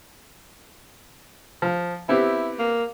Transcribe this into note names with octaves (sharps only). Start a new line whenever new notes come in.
F3
B3 C4 E4 G4
A#3